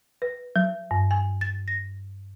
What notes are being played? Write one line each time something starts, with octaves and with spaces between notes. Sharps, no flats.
B4
F#3
G2
G#5
A6
A#6